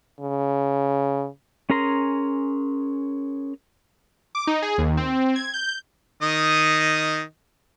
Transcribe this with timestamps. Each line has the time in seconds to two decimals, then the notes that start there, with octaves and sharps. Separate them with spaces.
0.21 C#3
1.70 C#4 G#4 A#4 A#5 C6
4.35 D6
4.47 D#4
4.62 G#4
4.78 D#2
4.97 C4
5.36 G#6
5.54 G6
6.22 D#3 D#5 D#6